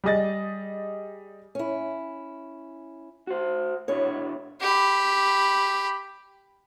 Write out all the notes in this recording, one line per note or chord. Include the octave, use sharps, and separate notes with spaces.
G3 G#4 D#5 A6
C#4 E4
F#4 C5
B2 D4 E4 C#5
G4 B5